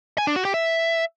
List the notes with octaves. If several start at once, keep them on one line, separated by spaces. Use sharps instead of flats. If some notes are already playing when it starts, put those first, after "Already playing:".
G#5
D4
F#4
G4
E5